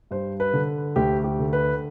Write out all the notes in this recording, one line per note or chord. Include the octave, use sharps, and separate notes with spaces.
G2 C5
B4
D3
D2 G4
G4
D3
B4